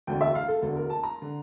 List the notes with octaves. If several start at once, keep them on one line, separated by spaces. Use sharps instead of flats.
E1 D2 D3 G5
E5
F5
A4
E1 D2 D3 A4
A#4
A5
A#5
D3